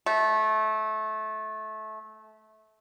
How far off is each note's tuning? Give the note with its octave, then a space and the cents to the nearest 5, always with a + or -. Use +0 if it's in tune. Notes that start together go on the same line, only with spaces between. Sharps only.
A3 -20